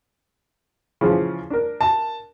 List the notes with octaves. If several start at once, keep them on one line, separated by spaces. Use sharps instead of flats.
C#3 E3 F3
D4 A#4
A5